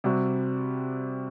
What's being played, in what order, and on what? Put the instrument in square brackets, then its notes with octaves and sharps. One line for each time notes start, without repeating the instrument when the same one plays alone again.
[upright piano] C3 G3 C4 F#4